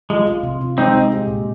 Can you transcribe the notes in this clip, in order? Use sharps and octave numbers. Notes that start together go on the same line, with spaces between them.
G#3 F4
F4
C3
F4
G#3 C4 D#4
G#3
G4
A#2